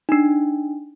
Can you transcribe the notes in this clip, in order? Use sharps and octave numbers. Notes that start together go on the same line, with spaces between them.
D4 D#4